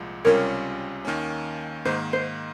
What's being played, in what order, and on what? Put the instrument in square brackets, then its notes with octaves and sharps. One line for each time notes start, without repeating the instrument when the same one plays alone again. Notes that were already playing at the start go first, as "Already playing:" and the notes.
Already playing: [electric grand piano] C2 A#2 F3 G#3
[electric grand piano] C#2 C3 G3 C#4 F4 [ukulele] A#4 C#5
[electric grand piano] D#2 D#3 A#3 C#4
[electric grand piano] G#2 D#3 A#3 [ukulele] C5
[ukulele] C5